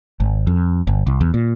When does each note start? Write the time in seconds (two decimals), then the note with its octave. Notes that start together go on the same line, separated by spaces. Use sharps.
0.20 G#1
0.47 F2
0.87 G1
1.07 C2
1.21 E2
1.34 A#2